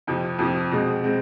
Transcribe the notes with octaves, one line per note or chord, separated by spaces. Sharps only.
F2 C3 F3
F2 C3 F3
B2 G#3 C4
G#3 C4